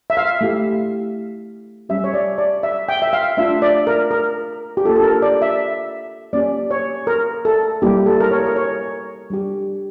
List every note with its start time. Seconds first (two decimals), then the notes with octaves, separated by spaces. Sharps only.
0.10 E5
0.17 F5
0.41 A3 E4 G4
1.89 G3 C#4 G4 E5
2.04 C#5
2.14 D5
2.38 D5
2.63 E5
2.89 G5
3.02 E5
3.13 F5
3.37 A3 D4 F4 E5
3.62 D5
3.87 A#4
4.11 A#4
4.77 G4
4.85 A#3 D4 F4 A4
4.96 A4
5.04 A#4
5.22 D5
5.42 E5
6.33 A#3 C#4 G4 D5
6.71 C#5
7.07 A#4
7.45 A4
7.82 G3 A#3 E4 G4
8.06 A4
8.20 A#4
8.31 C#5
8.46 A#4
8.56 C#5
9.30 G3 D4 G4